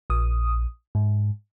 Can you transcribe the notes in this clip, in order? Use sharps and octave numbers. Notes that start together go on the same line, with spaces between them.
A#1 D#6
G#2